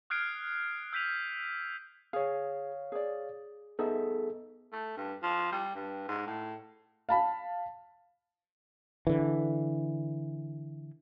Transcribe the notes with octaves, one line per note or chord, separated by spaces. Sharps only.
D#6 F6 F#6 G#6 C7 D7
E6 G6 B6 D#7 F7
G#4 C#5 F5
G#4 D5
B3 D#4 G#4 A4 E5
A3
G2
F3
G3
G2
G#2
A2
F5 A5 B5
D3 E3